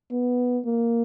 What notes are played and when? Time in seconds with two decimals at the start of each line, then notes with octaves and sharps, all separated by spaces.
0.11 B3
0.65 A#3